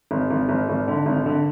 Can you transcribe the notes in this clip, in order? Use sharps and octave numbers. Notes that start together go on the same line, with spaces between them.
G#1
G#1
G#1
G#1
D3
G#1
D3